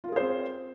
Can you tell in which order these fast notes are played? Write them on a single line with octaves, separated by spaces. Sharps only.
F4 A#4 G#4 C5 C4